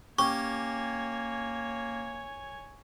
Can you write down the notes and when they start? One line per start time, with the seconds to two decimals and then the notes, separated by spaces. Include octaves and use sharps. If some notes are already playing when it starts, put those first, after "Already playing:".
0.19 A#3 C#4 G4 C#5 G#5 C#6